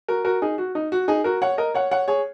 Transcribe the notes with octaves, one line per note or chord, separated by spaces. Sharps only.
F#4 A#4
F#4 A#4
D#4 G#4
F#4
D#4
F#4
D#4 G#4
F#4 A#4
C#5 F#5
A#4 D#5
C#5 F#5
C#5 F#5
G#4 C#5